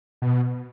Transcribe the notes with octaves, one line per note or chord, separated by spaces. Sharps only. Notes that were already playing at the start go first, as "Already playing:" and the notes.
B2